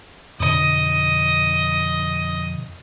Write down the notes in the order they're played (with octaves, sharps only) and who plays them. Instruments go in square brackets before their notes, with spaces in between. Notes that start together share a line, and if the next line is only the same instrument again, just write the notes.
[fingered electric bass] F2 B2 D3 [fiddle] D#5